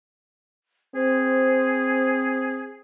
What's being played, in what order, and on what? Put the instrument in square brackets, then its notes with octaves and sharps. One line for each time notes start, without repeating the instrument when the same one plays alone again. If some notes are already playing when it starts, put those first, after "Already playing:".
[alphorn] C4 [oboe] G#4 [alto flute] C5